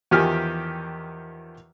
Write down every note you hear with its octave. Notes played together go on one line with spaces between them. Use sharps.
E2 D#3 F3 G4 G#5 F6